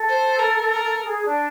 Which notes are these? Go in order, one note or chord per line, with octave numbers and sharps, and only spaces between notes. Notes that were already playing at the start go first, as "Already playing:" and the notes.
Already playing: A4
C5
A#4
A#4
G#4
D4